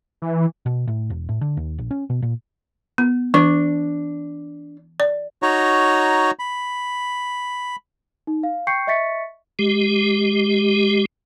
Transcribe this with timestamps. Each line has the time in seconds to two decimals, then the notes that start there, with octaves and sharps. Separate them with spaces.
0.22 E3
0.66 B2
0.88 A2
1.10 E1
1.29 A2
1.41 D3
1.57 D#2
1.78 A#1
1.91 C#4
2.10 B2
2.22 A#2
2.98 B3
3.34 E3 D4
5.00 D5
5.43 D#4 F#4 C#5 A#5
6.39 B5
8.27 D#4
8.43 F5
8.67 G5 C#6 G6 C7 C#7
8.87 D#5 E5 C#6 A6 B6 C#7
9.59 G#3 G4